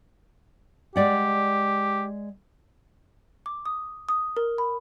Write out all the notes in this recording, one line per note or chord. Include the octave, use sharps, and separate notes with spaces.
G#3 G4 D5 F#5
D6
D#6
D#6
A#4
B5